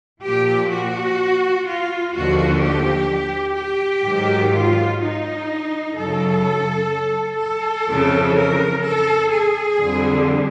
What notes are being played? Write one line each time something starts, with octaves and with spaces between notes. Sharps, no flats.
A#2 F3 G4
F#4
F4
D#2 D3 F3 F#4
G4
G4
G#2 D#3 F#3
F4
D#4
F#2 C#3 F#3 A4
A4
F2 C#3 E3
A#4
A4
G#4
F2 D3 G3